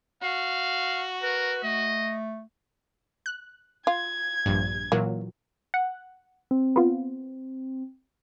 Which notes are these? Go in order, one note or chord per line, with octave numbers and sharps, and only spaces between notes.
F#4 F5
A#4 B4
A3 D#5
F#6
F4 G#6
A#1 G2
A#2 E3 F#3 A#3
F#5
C4
B3 F4